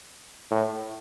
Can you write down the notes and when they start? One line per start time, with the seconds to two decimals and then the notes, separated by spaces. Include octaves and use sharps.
0.51 A2